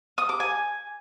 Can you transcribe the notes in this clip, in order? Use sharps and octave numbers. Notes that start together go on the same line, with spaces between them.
D#6
D6
G#5